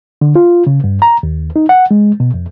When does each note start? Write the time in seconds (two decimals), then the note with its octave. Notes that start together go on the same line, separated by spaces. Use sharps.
0.21 D3
0.36 F4
0.67 C#3
0.84 G2
1.02 A#5
1.23 D#2
1.56 D#4
1.69 F#5
1.91 G#3
2.20 B2
2.34 F2